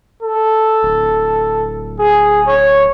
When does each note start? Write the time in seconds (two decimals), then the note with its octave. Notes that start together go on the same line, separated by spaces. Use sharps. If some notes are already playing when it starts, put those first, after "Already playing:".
0.23 A4
0.83 D1
1.99 G#4
2.47 C#5